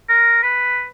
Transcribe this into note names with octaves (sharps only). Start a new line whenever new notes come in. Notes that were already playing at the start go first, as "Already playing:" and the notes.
A#4
B4